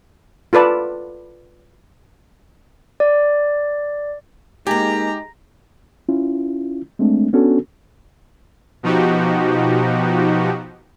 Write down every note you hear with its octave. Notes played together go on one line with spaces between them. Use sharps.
F4 A4 B4 D5 A5
D5
G#3 A#3 D#4 G4 G#5 A#5
C#4 E4 F4
G#3 A3 C4 D4
B3 C#4 D4 F#4 A4
B2 F3 D#4 F#4 G4